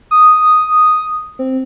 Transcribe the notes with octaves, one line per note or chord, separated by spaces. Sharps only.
D#6
C4